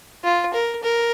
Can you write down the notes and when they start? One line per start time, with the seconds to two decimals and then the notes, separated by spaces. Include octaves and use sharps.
0.24 F4
0.54 A#4
0.83 A#4